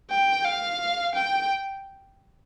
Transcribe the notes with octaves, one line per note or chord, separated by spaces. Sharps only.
G5
F5
G5